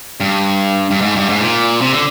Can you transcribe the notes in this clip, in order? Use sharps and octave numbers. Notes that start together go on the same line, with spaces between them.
G2
G2
G#2
G2
G#2
A#2
C3
D3